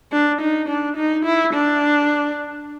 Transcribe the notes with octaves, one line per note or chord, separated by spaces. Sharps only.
D4
D#4
D4
D#4
E4
D4